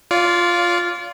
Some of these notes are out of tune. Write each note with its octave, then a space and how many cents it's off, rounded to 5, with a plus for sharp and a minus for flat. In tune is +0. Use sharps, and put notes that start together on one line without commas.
F4 +0 D5 -35